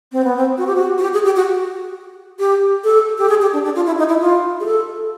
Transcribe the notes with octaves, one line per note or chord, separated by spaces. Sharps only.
C4
B3
C4
F#4
G4
F#4
F#4
G4
G#4
G4
F#4
G4
A4
G4
G#4
G4
D4
D4
F4
E4
D#4
E4
F4
G#4
A4